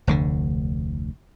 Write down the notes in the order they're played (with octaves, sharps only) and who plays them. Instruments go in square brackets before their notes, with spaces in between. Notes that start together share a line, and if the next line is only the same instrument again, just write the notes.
[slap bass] F1 D2 D3